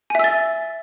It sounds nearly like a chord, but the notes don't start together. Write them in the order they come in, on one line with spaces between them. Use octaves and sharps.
G#5 E5 E6 A6